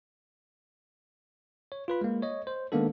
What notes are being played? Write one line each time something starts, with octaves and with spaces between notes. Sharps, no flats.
C#5
F4 B4 B5
G#3 A#3
C#5 D#5
C5
D#3 G#3 A#3 B3 D4 A4